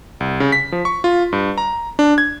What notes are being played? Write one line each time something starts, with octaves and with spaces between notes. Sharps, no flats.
C2
C#3
B6
F3
C#6
F4
G2
A#5
D4
G#6